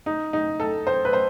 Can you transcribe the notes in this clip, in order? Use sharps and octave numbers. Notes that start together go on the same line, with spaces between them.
D#4
D#4
A4
C5
B4
C5